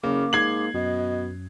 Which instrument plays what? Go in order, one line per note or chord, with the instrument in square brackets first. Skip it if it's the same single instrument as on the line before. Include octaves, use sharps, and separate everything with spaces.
[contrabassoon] F#1 [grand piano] C#3 [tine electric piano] A#3 [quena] D6
[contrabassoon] G#2 [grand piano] G#6 C7 F#7
[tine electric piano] F#2 [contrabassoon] B2 [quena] D#5